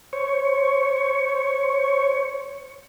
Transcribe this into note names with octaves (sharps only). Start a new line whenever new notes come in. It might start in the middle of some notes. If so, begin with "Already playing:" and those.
C5 C#5 C#6